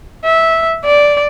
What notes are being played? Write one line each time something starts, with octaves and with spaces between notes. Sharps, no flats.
E5
D5